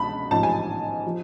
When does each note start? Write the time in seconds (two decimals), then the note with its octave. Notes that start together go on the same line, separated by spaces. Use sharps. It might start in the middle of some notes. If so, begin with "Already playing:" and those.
Already playing: C#2 B2 A5 B5
0.31 A1 G#2 F3 A5
0.43 G#5
1.07 F3